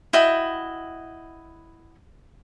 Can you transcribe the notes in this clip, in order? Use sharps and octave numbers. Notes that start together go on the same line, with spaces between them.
E4 F#4 D#5 G5